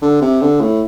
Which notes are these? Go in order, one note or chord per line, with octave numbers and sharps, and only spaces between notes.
D3
C3
D3
A2